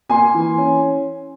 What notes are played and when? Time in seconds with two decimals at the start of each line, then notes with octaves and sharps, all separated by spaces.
0.09 A#3 G#5 C6
0.34 E3
0.58 C#4